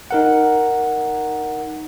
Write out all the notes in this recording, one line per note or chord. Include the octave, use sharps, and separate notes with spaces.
D#4 A#4 F#5